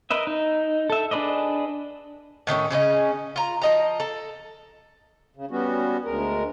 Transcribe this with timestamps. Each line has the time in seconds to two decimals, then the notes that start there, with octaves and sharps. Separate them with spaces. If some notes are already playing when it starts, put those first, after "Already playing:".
0.10 A#4 B4 D#5 E5
0.27 D#4
0.90 A4 E5
1.11 D4 G#4 B4 D5 D#5
2.47 A2 D#3 A3 C#4
2.70 C#3 C#4 E4 D#5
3.36 F4 A#5
3.62 F3 D#5 A#5
4.00 A4
5.36 C#3
5.51 G3 B3 C#4 F#4
6.05 D2 G#3 A#4